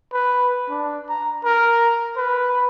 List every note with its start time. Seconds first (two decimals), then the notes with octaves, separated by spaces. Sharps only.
0.13 B4
0.69 D4
1.09 A#5
1.45 A#4
2.17 B4